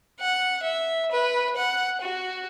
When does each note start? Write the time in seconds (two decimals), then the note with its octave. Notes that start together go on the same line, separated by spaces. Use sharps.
0.20 F#5
0.62 E5
1.11 B4
1.56 F#5
2.01 F#4